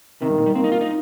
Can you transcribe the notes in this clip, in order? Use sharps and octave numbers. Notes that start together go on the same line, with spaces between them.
C3 D#3
G2
A#2
G3
A#3 C4
D#4
F4
D#4